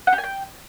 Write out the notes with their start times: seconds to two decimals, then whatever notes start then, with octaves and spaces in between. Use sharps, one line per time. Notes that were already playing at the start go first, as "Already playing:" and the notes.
0.07 F#5
0.13 G4
0.18 G#5
0.24 G5